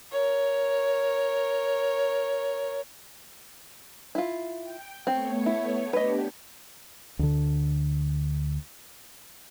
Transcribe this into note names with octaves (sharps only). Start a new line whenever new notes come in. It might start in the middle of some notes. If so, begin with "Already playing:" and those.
A#4 C#5
E4 F4
G5
A3 B3 C4 C#5
E4
B3 D4 G4 B4 D#5
D2 D3